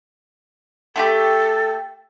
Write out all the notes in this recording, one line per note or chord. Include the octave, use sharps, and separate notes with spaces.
A3 F4 G4 A4